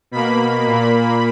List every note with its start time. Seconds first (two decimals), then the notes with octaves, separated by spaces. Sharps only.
0.11 B2 A#3 B5
0.67 A#2 A#3